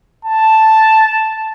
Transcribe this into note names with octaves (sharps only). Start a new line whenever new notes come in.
A5